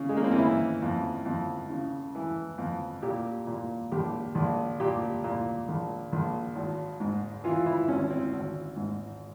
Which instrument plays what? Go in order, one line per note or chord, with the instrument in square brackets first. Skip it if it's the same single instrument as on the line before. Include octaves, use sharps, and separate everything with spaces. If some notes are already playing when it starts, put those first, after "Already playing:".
Already playing: [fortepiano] C#3
G#3
A#3
C4
C#4
E3 E4
F2
F2
C#3
E3
F2
A#2 G4
A#2
A#1 G4
A#1
A#2 G4
A#2
A#1
A#1
G#1
G#2
E3 F4
E4
G#1 C#4
C4
G#1
G#2